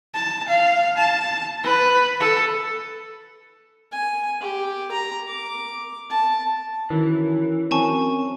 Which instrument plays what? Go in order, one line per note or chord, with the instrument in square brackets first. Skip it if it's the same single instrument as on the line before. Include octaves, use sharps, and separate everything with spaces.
[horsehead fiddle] A5
F5
A5
B4
A4
[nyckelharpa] G#5
G4
A#5
D6
A5
[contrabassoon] F#2 [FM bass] D#3 [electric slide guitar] E3
[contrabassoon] F#2 [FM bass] C4 [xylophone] G#5 A5 C#6